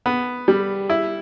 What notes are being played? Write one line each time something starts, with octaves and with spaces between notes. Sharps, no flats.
B3
G3
E4